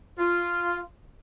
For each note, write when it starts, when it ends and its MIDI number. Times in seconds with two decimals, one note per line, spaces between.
0.17 0.82 65